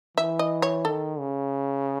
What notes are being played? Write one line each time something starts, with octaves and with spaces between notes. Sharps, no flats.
E3 E5
D#5
C#5
D#3 A4
C#3